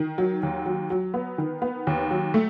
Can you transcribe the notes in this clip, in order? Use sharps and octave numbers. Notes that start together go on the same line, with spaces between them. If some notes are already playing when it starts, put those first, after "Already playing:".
Already playing: D#3
F#3
D#2
F#3
F#3
B3
D#3
B3
D#2
F#3
A3